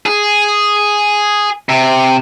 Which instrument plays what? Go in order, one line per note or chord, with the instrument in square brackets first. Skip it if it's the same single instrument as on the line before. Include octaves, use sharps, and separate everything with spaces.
[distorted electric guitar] G#4
C3